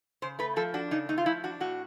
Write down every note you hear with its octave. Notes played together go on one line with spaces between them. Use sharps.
C#3 C5
A3 B4
F3 A4
D4 F#4
C#3 D#4
A3 D#4
F4
F3 E4
D4 F#4
A2 F#4